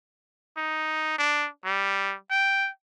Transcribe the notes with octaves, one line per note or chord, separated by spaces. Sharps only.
D#4
D4
G3
G5